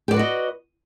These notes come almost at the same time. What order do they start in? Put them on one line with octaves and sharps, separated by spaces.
G4 D5 B4 F#4 D#5